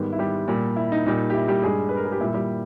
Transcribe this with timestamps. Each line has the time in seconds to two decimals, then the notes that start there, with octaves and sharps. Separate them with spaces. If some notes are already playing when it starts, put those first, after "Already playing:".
Already playing: G#2 D#3 G3 B3 B4
0.13 E4
0.19 G3 G4
0.48 A#2 G3
0.76 E4
0.92 D#4
1.06 A#2 G3 D#4
1.30 G4
1.34 E4
1.48 G3 G4
1.62 G2 G3 G#3 G#4
1.89 B4
1.97 A#4
2.05 G#4
2.12 G4
2.20 A#2 G3 E4
2.34 G3 G4